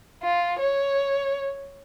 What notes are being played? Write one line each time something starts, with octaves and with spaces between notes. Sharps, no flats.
F4
C#5